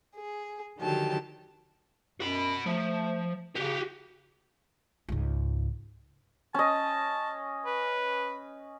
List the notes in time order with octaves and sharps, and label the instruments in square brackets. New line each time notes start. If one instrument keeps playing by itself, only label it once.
[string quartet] G#4
D3 D#3 F3 F#3 G4 A5
[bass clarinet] F#2 [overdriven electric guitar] F#4 B5
[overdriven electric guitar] F3 [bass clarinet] A3
[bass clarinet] C#3 [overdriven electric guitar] F#4 G4
[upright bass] C#2 G#2
[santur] C#4 D#5 [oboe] A5
[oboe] B4